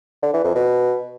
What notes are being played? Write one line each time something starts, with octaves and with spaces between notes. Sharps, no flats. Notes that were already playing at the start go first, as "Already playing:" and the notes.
D3
E3
F2
B2